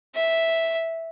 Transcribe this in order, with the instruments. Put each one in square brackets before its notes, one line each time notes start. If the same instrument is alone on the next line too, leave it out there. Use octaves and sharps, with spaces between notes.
[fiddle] E5